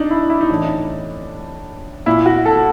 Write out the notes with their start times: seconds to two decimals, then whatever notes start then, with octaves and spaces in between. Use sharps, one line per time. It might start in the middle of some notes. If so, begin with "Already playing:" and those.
Already playing: D4 D#4
0.10 E4
0.30 E4
0.41 D#4
0.50 A2 E3 D4
0.63 D#4
2.06 A#2 E4
2.26 F#4
2.46 A4